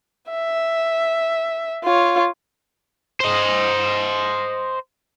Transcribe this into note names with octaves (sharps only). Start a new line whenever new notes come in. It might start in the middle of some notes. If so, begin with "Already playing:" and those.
E5
F4 C#5
C5 D#5